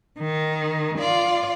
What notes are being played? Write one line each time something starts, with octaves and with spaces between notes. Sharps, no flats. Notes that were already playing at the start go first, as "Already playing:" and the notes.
D#3
F4 D5